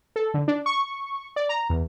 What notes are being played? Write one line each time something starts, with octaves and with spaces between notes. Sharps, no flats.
A4
D3
D4
C#6
D5
A#5
E2